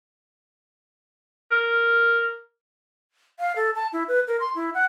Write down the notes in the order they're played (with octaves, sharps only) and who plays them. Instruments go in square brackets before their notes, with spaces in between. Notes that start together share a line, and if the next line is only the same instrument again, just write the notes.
[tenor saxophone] A#4
[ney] F5
A4
A5
E4
B4
A#4
C6
E4
F#5